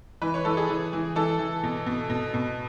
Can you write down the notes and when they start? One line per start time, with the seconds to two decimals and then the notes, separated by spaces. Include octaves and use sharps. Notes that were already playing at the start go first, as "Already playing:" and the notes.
0.22 E3 B4
0.34 C#5
0.45 E3 A4
0.57 G#4
0.69 E3
0.93 E3
1.16 E3 A4
1.39 E3
1.63 B2
1.86 B2
2.10 B2
2.34 B2